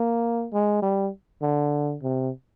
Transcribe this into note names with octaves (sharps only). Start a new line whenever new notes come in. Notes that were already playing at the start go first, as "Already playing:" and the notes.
Already playing: A#3
G#3
G3
D3
C3